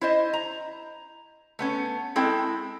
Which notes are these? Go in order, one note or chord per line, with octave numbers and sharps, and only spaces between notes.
E4 C5 D#5
A#5
A3 B3 C#4
G#3 C4 E4 A4 G5